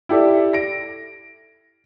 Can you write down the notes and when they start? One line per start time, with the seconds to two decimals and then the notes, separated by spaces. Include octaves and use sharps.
0.09 E4 G4 A4 D5 E5
0.53 A#6 D7